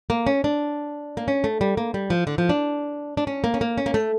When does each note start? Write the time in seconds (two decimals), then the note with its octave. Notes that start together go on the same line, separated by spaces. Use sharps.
0.10 A#3
0.27 C#4
0.44 D4
1.17 A#3
1.28 C#4
1.44 A3
1.61 G3
1.77 A#3
1.94 G3
2.10 F3
2.27 D3
2.38 F3
2.49 D4
3.17 D4
3.27 C#4
3.44 A#3
3.54 C#4
3.61 A#3
3.78 C#4
3.86 A#3
3.94 A3